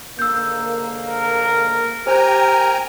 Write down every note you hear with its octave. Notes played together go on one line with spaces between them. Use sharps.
G#2 D3 A#3 E6 G6
A#4
G4 A#4 C5 G5 G#5 A#5